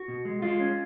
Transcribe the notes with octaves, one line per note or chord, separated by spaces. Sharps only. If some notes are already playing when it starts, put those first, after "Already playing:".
Already playing: F#4
B2
G#3
G#3 F4
C#4